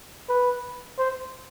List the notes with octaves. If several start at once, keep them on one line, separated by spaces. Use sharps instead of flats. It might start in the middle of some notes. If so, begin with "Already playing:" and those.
B4
C5